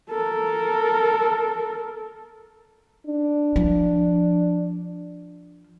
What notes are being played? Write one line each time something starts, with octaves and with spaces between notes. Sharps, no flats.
A4 A#4
D4
F3